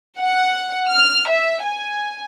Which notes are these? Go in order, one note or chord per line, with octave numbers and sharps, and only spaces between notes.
F#5
F6
E5
G#5